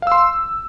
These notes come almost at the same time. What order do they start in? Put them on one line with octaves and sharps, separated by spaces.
F5 E6 C6